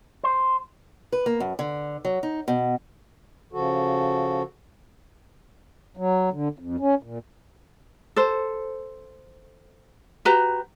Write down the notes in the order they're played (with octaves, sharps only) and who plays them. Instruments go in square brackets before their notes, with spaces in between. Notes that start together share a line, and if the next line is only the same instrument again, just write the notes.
[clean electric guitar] C5
[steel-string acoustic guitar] B4
A#3
F#2
D3
F#3
D#4
B2
[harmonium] C#3 F3 F#4 A4
F#3
D3
F2
C#4
A#2
[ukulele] A4 C5
F#4 G4 B4 A#5